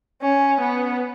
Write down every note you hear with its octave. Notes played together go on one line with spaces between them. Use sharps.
C#4
B3